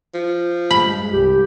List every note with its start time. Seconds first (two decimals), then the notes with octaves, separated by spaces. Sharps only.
0.14 F3
0.71 G2 G#3 B5
1.12 C2 G4